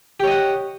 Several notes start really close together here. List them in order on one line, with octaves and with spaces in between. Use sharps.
G4 C#5 D#5 F#5